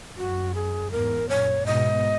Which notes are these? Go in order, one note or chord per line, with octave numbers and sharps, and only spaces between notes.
F#2 F#4
G#4
E2 G#2 A#4
F#2 A#2 C#5
G#2 B2 D#5